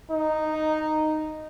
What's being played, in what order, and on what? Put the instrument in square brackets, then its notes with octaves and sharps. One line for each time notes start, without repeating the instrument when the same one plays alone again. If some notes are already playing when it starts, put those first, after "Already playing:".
[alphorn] D#4